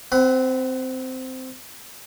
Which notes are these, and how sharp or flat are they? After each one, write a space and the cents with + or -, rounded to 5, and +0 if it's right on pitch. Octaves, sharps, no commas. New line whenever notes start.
C4 -15 F#5 +25 B5 +20